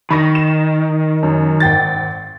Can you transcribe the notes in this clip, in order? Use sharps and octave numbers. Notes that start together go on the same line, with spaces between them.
D#3 B5 C#6 A#6
E7
F#2
G#1 G5 A6